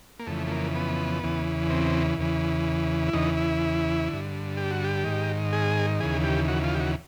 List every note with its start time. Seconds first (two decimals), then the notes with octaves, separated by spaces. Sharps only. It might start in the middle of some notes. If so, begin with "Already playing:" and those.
0.20 A#3
0.27 F2 C#3 E3 A3
0.47 A3
0.51 A#3
0.75 B3
1.23 E2 C#3 E3
1.70 C4
2.18 E2 C#3 E3
3.08 E4
3.13 E2 C#3 E3 D#4
3.37 E4
4.09 G2 D3
4.57 G4
4.71 F#4
4.84 G4
5.04 G#2 D#3
5.53 G#4
6.00 D#2 C#3 E3 G#4
6.23 G4
6.48 F#4
6.64 F4
6.75 G4
6.80 F#4